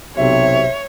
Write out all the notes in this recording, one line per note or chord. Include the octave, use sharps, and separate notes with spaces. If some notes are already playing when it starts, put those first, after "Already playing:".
B1 C3 C#5 E5